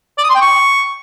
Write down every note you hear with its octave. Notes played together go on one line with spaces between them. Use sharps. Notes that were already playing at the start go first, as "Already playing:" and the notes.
D5
D#6
C6
G5
C#6